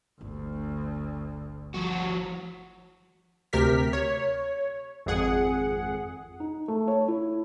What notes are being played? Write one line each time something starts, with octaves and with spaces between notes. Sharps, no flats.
G1 D2
F3 F#4
D2 C3 G4 A#4 F6 B6
C#5
G#1 F2 G#4 F#5
D#4
A3
C#5
E4